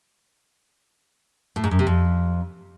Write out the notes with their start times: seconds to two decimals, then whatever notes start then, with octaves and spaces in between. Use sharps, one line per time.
1.56 A2
1.64 G#2
1.71 F#2
1.79 C3
1.87 F2